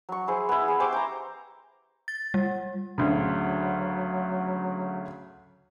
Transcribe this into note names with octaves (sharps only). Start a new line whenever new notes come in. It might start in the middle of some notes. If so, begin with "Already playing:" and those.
F#3 C#6
E4 G#4 C5
B3 E4
G#4
G4 C5 C#6 D6
G5 A#5
A6
G3
D2 C#3 F#3